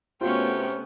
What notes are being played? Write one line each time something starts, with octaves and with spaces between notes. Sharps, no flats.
C3 A3 B3 C#4 F4 F#4 C#5 G5